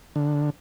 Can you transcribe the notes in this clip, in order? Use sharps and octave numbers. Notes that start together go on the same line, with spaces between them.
D3